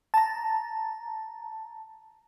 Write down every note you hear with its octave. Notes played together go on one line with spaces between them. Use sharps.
A5 A#5